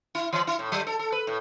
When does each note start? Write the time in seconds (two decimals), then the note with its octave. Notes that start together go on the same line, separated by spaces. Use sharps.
0.15 E4
0.33 E3
0.47 E4
0.59 A2
0.72 F#3
0.87 A4
0.99 A4
1.12 B4
1.27 A2